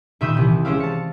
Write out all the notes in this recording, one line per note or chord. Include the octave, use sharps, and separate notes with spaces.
A#2 D#3 E5 B5 D#6 G6
C2 E3
G#3 C#4 C5 D5 E5 F5
A5 C#7